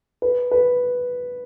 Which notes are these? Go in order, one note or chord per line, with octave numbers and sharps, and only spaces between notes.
B4
B4